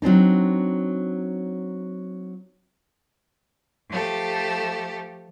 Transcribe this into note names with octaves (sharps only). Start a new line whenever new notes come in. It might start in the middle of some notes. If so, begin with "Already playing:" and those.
F#3 C4 D4 D#4
F3 A3 G4